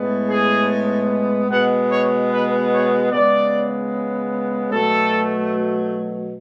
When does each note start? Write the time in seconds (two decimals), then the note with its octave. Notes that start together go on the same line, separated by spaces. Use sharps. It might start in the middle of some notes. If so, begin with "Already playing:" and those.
Already playing: A2 G#3 B3
0.28 G#4
1.50 B2 G#3 B3 F#5
1.89 C#5
2.30 B4
2.71 C#5
3.10 C#3 G#3 B3 D5
4.72 B2 F#3 A3 A4